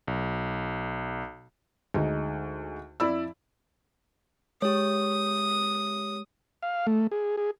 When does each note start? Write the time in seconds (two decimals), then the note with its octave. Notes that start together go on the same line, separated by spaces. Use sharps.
0.08 B1
1.94 D2 G#3 D#4
3.00 F2 E4 D5 B5 E6
4.62 G#3 G4 C#5 D#6
6.63 F5
6.87 A3
7.12 G#4
7.37 G#4